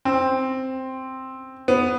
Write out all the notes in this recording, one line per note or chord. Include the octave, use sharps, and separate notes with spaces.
C4
B3